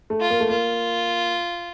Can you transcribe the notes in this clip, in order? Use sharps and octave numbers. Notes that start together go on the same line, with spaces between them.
A3
F4
A#3
A3
A#3 F4